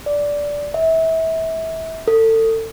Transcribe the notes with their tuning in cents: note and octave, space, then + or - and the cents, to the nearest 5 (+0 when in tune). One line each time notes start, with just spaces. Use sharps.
D5 -10
E5 -25
A4 +30